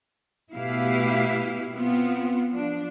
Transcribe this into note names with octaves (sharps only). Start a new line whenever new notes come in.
B2 A3 E4 G4 B4 F5
B3 C4 F4
F3 D4